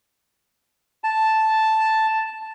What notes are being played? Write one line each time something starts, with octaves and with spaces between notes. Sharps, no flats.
A5